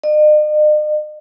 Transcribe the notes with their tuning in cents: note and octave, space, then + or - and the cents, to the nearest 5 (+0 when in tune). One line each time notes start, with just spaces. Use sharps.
D#5 -45